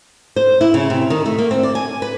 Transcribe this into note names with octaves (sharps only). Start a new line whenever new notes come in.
C5
E4
C#3
C3
D#3
A3
A#3
C4
D5
G#5
B4